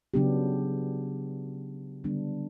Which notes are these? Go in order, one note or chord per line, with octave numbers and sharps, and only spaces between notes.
C#3 F#3 B3 D4 G4
D3 G3 B3 D4